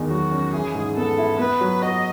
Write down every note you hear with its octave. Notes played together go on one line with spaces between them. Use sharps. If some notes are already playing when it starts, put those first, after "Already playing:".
Already playing: E2 D#3
F#3 F#4
C#4
E3 G#4
G#2
B3 A4
E4
B3 B4
F#3
F#4 D#5